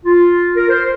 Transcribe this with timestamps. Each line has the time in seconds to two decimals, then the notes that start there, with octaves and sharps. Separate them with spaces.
0.05 F4
0.56 A#4
0.70 C5